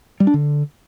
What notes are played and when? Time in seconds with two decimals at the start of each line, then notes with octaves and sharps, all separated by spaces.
0.20 G3
0.27 D4
0.34 D3